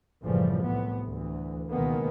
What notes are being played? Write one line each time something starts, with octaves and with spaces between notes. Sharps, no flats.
F#1 A2 C#3 E3 F3 G3
C2 A2 C3 B3
D2 E3
C#2 B2 D#3 G#3 A#3 B3